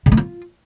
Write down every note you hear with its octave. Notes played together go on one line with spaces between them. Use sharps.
C#3
A3
F4